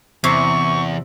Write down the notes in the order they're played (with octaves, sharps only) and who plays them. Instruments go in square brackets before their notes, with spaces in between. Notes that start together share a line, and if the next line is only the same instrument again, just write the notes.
[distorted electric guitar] E2 [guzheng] C3 [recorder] C#6